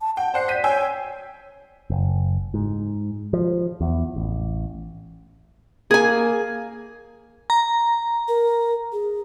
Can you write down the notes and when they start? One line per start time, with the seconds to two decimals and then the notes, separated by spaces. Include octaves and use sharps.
0.01 A5
0.17 F#5 G5
0.34 C5 D5 F#5 C7
0.48 G6 B6 D#7
0.64 C#5 G5 G#5 E6
1.90 F#1
2.54 G#2
3.33 F3
3.81 E2
4.16 A1
5.91 A#3 G#4 G#5
7.50 A#5
8.28 A#4
8.92 G#4